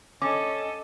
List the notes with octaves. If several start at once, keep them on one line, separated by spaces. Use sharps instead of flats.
C#4 A4 D#5 D6